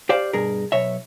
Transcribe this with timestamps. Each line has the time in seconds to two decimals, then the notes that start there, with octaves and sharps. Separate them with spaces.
0.09 G4 C5 D5 F5
0.33 G2 B2 G#4 A#4
0.72 B1 B2 C#5 E5